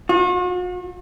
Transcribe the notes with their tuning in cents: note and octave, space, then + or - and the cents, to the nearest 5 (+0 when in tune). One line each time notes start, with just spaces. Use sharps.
F#4 -45